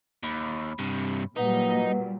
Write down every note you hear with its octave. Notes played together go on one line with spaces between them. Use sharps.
D#2 B5
G2 C3
A#2 F#3 G3 D#4 B4 F#5